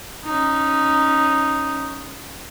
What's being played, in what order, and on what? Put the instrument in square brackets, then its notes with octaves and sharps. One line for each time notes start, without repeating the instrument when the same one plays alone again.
[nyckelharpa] C#4 D#4